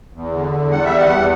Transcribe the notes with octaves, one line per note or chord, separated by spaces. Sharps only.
E2
D3
E2
G3 F#5
E5
E2
F#5
E2